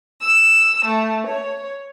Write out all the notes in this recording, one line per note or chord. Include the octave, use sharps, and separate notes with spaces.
E6
A3
C#5